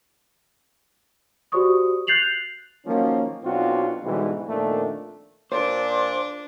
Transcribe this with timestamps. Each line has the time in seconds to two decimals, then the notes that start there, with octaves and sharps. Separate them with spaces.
1.52 F#4 G4 C5 D5 C#6 D#6
2.07 F#6 G6 A6 C7 F7 F#7
2.86 D#3 F3 F#3 A#3 C#4
3.44 B1 C4 D4 F4 F#4
4.04 G#2 B2 D3 E3 G3
4.48 F2 A#2 D#3 A3 D4
5.52 A#2 D4 C5 D5 D6